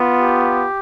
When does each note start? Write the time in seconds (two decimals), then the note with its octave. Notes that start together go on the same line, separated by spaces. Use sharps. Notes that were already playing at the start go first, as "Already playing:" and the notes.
Already playing: B3 F4
0.19 G4